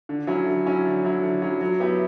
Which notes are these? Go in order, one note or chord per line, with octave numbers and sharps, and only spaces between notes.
D3
F#3 C#4 E4
D3
F#3 C#4 E4
D3
F#3 C#4 E4
D3
F#3 C#4 E4
F#3
B3 E4 G4